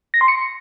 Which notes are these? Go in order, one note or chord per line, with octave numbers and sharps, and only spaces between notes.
A#6
C6
C#7